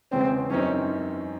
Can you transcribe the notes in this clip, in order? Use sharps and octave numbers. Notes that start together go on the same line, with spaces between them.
E2 C#3 G#3 C4 C#4
F#2 E3 C4 C#4 D#4